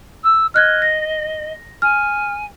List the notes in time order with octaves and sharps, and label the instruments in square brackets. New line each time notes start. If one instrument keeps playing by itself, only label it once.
[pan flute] E6
[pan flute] D#5 [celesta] F6 F#6 G#6
[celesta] A#6
[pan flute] G#5 [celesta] F6